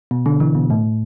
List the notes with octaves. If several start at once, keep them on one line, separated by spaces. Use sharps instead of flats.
B2
D3
E3
B2
A2